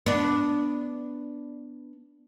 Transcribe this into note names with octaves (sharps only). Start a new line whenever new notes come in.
B3 D4